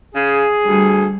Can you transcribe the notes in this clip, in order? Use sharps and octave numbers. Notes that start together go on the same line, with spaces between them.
C#3 G#4
D2 G3